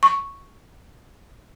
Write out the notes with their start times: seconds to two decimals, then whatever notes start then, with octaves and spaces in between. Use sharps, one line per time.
0.03 C#6